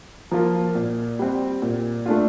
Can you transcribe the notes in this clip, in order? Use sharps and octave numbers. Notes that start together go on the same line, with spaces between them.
F3 A#3 F4
A#2
G3 C4
A#2
A3 D4 F4